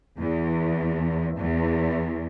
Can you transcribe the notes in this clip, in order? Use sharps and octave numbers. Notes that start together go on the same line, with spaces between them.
E2
E2